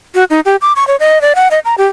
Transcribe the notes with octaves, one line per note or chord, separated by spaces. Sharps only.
F#4
D#4
G4
D6
C#6
C#5
D#5
D5
F#5
D#5
A#5
G4